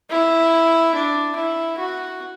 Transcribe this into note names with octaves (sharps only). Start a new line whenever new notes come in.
E4
D4
E4
F#4